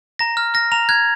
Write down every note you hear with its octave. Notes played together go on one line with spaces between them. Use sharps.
A#5 A#6
F6
F6 A#6
A#5 F7
F#6 G#6